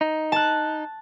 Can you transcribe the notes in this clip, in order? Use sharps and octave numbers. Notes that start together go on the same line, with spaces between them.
D#4
A5 F#6